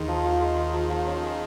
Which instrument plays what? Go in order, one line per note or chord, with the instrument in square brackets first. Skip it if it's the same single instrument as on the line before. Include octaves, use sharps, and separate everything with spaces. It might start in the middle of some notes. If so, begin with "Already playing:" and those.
Already playing: [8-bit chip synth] D#2 D#3 [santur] G#3 D#4
[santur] F3
F3
G#3
D#4
F3
F3
C#4
G#4